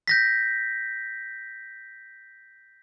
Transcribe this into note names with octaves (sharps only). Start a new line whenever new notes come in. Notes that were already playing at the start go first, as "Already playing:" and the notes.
G6 A#6 B6